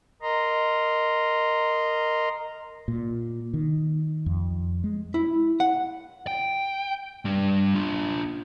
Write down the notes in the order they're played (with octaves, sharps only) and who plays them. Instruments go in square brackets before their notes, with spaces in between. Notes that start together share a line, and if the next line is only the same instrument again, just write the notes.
[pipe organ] A#4 D#5 A#5 C6
[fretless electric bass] A#2
D#3
F2
G#3
[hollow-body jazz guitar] E4
F#5
[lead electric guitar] G5
G3 D4
D4 F4